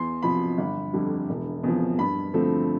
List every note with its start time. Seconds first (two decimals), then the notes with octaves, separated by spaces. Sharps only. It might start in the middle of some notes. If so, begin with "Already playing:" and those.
Already playing: E2 C6
0.22 C3 F3 B5
0.58 G1
0.93 F2 D3 G3
1.29 E1
1.63 E2 C3 F3
1.99 G2 B5
2.34 D3 F3 A3 C4